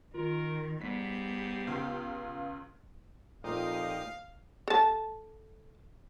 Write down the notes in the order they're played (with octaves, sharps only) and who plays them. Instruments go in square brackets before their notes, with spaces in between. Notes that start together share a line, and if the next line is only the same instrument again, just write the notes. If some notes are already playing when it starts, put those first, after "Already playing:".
[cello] D#3 [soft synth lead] F4 [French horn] A#4
[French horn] G#2 [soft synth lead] G3 [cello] B3 G4 [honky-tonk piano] B6
[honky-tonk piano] C#2 C#3 [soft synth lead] F5
[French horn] F2 [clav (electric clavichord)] A#2 [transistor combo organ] D#4 G4 D#5 [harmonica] F5
[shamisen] A4 A5